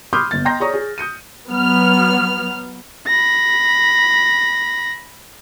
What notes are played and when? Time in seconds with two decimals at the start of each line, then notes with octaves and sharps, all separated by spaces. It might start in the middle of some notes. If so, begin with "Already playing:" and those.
0.13 B5 C6 D6 D#6 F6 G6
0.31 G1 A6
0.45 D#5 G5 A#5 C6 G6 A#6
0.60 G#4 C#5 D5 A#5 C#6 D#6
0.74 G#4
0.98 D#6 G6 C#7 D#7
1.50 F#3 B3 F6
3.07 B5 A#6